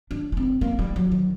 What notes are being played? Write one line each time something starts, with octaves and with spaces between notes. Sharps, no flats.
D4
D4
C4
A#3
G3
F#3
D#3